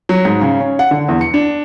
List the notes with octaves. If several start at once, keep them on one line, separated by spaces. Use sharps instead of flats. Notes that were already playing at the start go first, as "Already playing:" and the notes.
F#3
G#2
C#3
C#4
F#5
D3
E2
C#7
D4